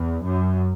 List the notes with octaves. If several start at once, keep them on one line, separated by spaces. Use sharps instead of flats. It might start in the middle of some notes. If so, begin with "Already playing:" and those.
Already playing: E2
F#2